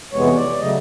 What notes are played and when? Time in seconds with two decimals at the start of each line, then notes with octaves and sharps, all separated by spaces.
0.13 F2 C3 E3 G#3 B3 C#5
0.35 D5
0.59 C#3 F#3 A3 D#5